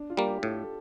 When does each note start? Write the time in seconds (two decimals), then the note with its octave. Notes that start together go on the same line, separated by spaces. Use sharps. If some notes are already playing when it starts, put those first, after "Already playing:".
Already playing: D4
0.10 F4
0.17 G3 A#3
0.27 G4
0.43 A2 A4